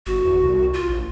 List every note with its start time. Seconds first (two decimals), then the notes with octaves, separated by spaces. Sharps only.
0.06 G1 F#4
0.25 E2
0.42 C2
0.74 F4
0.89 A#1